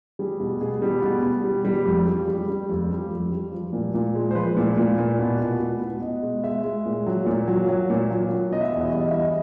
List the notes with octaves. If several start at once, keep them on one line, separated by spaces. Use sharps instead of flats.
G3 G#4
B2
B2 G#4
G3
B2
B2
G3
G3
F2
G3
G3
G3
F2
G3
F2
G3
F3
A#2
A#2
G#3
C5
F3 B4
A#2
A#2
A#2
B2
B2
B2
B2
B2 D#5
G#3
G#3 E5
G#3
A#2
F#3
A#2
F#3
F#3
A#2
F#3
F#3
B2 D#5
E5
D#5
E2 E5
D#5
G3 E5
D#5
E5
E2 D#5